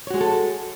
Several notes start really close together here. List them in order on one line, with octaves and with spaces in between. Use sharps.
C#5 F#4 G#3 G#4 A4